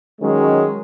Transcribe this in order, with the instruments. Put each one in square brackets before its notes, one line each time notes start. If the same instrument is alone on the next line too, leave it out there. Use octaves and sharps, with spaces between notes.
[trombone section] D#3 F#3 G#3 C#4